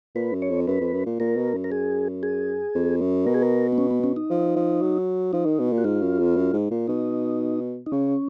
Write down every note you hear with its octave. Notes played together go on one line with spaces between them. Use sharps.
A#2 B4
F#2
C#5
F2
F#2 B4
F2
F#2
A#2
A#2 A#4
B2
F#2
A#4
G#4
G#4
F2
F#2
B2 A#4
G#4
A#4
B3
C#4
B3
C#4
D#4
F3
F3
F#3
F3 D#4
D#3
B2
A#2
F#4
G#2 F4
F#2
F2
F#2
G#2
A#2
B2 D#4
D#4
C#3 C#4